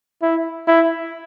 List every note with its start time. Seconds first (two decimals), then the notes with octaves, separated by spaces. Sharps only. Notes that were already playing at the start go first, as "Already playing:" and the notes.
0.22 E4
0.67 E4